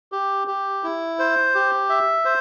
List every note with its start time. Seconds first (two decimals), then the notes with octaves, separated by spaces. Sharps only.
0.12 G4
0.48 G4
0.83 E4
1.19 C5
1.55 G4
1.89 E5
2.25 C5